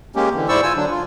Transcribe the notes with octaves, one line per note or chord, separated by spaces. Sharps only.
G#3 A#3 C#4 G4
D3 E3
G#2 E4 C5 D5 C#6 E6
F4 G#5 E6
D3 F#3 D4
F4